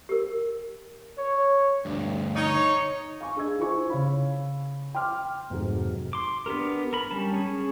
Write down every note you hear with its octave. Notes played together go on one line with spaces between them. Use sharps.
G4 A#4
C#5
D2 G2
D#4 C#5
F5 G#5 C#6
D4 G#4 D#5 E6 G#6
E4 F4 C5 G#5 C#6
C#3 C#5 F5 B5
G5 C6 D6 F6
F1 G#2 C3 F#3 G#3 A4
C6 D6
B3 D4 G4 A#4
A#4 B5
G3 C#4 A5
C#4 G#4